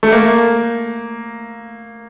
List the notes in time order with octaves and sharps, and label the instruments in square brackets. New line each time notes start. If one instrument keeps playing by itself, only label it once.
[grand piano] A3
A#3